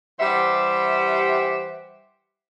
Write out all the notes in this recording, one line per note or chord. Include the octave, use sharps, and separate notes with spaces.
E3 G3 G4 C5 E5 F#5